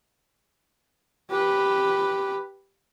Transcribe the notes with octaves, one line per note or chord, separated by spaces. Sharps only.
G4 B4